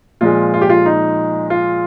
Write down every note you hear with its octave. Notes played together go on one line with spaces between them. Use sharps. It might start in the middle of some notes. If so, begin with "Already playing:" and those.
A#2 F3 G#3 F4
F4
G4
F4
D#4
F4